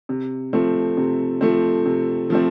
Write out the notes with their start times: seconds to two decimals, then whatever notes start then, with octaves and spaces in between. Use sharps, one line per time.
0.09 C3
0.53 F3 A3 C4
0.97 C3
1.41 F3 A3 C4
1.86 C3
2.30 F3 A3 C4